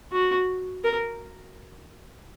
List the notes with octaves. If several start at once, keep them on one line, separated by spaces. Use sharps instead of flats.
F#4
A#4